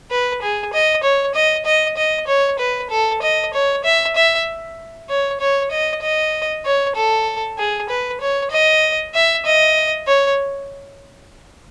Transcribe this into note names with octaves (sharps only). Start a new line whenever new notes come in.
B4
G#4
D#5
C#5
D#5
D#5
D#5
C#5
B4
A4
D#5
C#5
E5
E5
C#5
C#5
D#5
D#5
C#5
A4
G#4
B4
C#5
D#5
E5
D#5
C#5